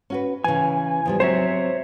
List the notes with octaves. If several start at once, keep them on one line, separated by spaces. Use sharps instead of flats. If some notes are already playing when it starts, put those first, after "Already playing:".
C#4 F#4 B4
C#3 E3 G#5
E2 F3 G3
F#3 C4 C5 C#5 E5